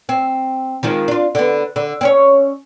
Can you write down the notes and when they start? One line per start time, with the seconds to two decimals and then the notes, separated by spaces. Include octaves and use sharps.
0.09 C4
0.83 D#3 F3 G#3
1.08 D4 F4
1.35 D3 B3
1.76 D3
2.01 C4 C#4 C#5